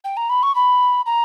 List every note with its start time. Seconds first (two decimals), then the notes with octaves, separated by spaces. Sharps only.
0.05 G5
0.17 A#5
0.30 B5
0.43 C#6
0.55 B5
1.06 A#5